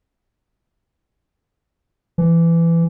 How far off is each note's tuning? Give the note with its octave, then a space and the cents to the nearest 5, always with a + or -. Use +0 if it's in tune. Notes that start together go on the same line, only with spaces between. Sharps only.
E3 +20